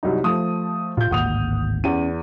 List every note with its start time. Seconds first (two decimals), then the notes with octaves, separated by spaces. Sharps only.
0.03 C2 F#3 D#4
0.24 F3 A3 D#6
0.97 A2 F4 G6
1.11 D1 G#1 A#3 F#5 D#6 F7
1.84 E2 C#4 D#7